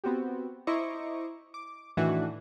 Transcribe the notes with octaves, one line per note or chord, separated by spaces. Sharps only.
B3 C4 F#4 G4
E4 C5 D#5 A#5 C#6 D6
D6
A2 D#3 E3 A3 D4 F#4